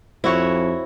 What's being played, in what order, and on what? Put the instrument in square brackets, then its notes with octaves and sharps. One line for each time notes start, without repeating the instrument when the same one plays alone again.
[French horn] F2 [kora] E4 F#4 C#5 [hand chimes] C5